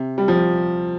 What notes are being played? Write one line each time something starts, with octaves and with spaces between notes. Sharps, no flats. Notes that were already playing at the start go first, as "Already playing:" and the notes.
Already playing: C3
G3
F3